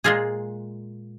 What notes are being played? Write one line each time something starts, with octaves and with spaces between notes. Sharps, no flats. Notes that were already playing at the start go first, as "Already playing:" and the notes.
A#2 G#3 F4 G#4